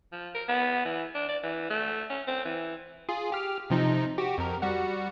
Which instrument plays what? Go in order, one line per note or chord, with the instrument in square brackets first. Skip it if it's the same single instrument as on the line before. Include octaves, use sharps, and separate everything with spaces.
[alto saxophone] F3
A#4
B3
E3
D4
D5
E3
A3
C#4
C4
E3
[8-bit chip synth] F4 G#4
G4 F6
C3 F3 D#4
F#4 G4
F2 A#4
G3 F#4 F#5